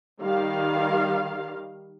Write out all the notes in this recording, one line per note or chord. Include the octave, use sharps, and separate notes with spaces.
D#3 G3 F5